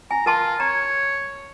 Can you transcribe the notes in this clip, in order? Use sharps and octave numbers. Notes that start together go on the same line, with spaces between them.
G#5 A#5
F4 A#4 A5 C6
C#5 A#5